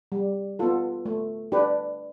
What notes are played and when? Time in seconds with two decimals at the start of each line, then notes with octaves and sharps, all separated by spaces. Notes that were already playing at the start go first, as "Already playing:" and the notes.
0.12 G3
0.59 B3 F4 A4
1.06 A3
1.52 D4 G4 B4